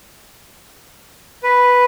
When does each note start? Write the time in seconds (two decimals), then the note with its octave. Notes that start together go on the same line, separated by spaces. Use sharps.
1.43 B4